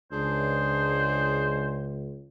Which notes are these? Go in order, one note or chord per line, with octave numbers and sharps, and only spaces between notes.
C#2 D4 G#4 C5